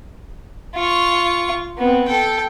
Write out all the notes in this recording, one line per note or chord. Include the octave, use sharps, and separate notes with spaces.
F4 C#6
B3 C4
A4 G5